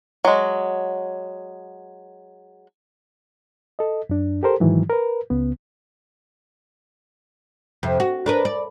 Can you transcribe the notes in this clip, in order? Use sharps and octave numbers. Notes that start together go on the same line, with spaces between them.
F#3 G#3
A4 D#5
F#2 D4
G4 A4 A#4 C5
G#2 D#3 E3 F#3
A#4 B4
C#2 C#3 B3
F2 C3
F#4
D4 A#4 B4
D5